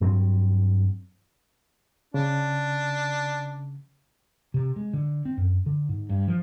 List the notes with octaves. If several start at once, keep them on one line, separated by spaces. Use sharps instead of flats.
G2 F#3 C4
C#3 D4
C3
G#3
D3
C4
F#2
D3
G#2
G2
F3